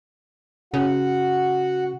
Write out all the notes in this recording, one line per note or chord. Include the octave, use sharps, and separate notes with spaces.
C#3 F#4 F#5